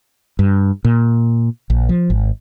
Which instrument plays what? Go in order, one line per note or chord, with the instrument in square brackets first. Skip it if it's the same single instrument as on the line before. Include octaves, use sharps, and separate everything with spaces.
[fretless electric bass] G2
A#2
A#1
F3
G#1